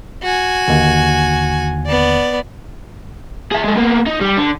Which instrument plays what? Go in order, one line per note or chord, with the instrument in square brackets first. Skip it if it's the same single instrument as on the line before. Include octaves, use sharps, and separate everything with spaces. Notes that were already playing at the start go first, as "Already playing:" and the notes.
[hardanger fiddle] F#4 G#5
[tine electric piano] D#2 D3
[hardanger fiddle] B3 D5
[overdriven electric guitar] G#4 E5
G#3 A4
A#3 B3
D#4
G3
D3